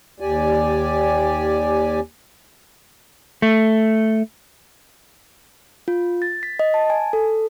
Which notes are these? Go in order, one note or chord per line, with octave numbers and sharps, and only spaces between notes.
D#2 G4 D5 G#5
A3
F4
A6
B6
D#5
A5
G#5
A4